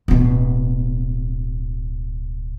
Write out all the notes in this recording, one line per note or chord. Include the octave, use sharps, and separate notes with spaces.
D1 B2